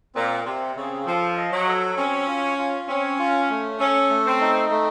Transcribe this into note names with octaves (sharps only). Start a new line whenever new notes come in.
A#2 C4
C3 C4
C#3 C4
F3 A4
D#5
F#3
A4
C4 C#4
F4
F4
C4 C#4
F4
A3
C#4 A4
A3
C4
D#4
A3